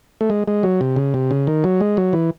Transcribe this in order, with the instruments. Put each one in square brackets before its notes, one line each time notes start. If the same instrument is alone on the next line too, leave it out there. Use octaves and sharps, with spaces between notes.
[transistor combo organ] A3
G#3
G#3
F#3
C3
C#3
C3
C#3
D#3
F#3
G#3
F#3
E3